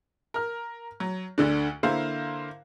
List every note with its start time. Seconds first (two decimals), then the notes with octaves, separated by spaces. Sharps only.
0.34 A#4 F6
1.00 F#3
1.38 D2 D3 D4
1.83 D3 A#3 E4 C5 F5